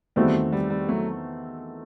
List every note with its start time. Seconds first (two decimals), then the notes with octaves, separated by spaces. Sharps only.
0.16 E2 D#3 G3 A3 B3 C4 F#4
0.52 G3
0.70 G3
0.89 F#3 A3